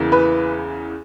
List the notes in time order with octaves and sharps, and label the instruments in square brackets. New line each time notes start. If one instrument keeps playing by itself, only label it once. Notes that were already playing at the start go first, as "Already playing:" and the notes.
Already playing: [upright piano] E2 C#3 E3 A#3
B4